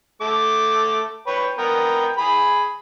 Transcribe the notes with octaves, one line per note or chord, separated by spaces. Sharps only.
A3 D6
B4 C#5 G5
B3 A#4 G5
G#4 B5